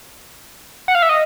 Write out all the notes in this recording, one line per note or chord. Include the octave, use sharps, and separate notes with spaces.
F#5
F5
E5
D#5